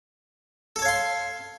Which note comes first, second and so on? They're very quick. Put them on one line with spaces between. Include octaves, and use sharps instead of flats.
A4 A5 C#5 F5 C6